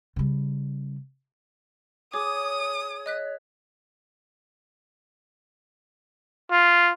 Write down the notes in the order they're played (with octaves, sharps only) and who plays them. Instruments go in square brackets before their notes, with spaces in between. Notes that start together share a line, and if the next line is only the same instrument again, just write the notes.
[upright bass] C#3 G3
[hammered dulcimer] G#4 [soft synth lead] C#5 [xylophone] D6 [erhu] D#6
[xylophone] D#5 F#6 B6
[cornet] F4